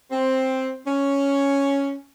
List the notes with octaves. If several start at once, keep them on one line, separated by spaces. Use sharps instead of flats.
C4
C#4